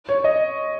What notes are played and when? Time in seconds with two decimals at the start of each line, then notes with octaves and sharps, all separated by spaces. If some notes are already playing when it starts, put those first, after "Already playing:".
0.09 C#5
0.24 D#5